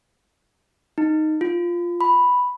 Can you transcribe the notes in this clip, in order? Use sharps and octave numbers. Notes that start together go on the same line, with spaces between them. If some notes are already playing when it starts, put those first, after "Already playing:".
D#4
F4
B5